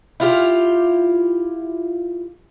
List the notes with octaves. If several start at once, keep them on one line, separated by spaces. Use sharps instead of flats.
E4 F4 G4